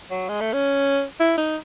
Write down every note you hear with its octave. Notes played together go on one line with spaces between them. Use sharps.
F#3
G#3
A3
C#4
E4
D#4